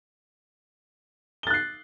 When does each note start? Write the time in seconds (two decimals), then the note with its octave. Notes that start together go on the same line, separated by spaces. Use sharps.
1.43 G7
1.47 A6
1.50 F#6
1.54 C7